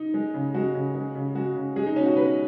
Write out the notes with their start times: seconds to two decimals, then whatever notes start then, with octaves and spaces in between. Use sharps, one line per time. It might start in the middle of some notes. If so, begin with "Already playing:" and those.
Already playing: D#4
0.14 G#3
0.34 C#3
0.54 G#3 F#4
0.75 C#3
0.95 G#3
1.15 C#3
1.35 G#3 F#4
1.56 C#3
1.76 G#3 G#4
1.87 D#4
1.96 B2 C#4
2.06 F#4
2.16 G#3 B4